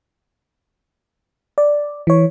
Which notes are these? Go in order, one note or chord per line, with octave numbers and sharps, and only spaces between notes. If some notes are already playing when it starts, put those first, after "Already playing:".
D5
E3 C#5